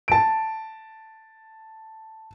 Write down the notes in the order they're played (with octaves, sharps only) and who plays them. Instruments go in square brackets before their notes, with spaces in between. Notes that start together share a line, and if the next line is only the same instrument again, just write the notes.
[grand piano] A5 D7